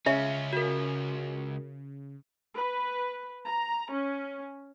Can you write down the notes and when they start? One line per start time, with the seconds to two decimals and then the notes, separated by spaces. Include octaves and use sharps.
0.06 C#2 C#3 C#4 E5
0.53 F#4 A#4
2.55 B4
3.44 A#5
3.91 C#4